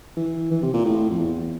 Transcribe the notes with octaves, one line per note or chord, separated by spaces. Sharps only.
E3
E3
C3
A#2
A2
F2
E2